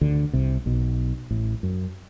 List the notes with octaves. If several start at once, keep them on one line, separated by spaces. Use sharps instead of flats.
D2 D3
C2 C3
B1 B2
A1 A2
F#2